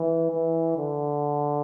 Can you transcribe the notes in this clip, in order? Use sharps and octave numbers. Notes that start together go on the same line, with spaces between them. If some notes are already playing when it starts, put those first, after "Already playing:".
Already playing: E3
E3
D3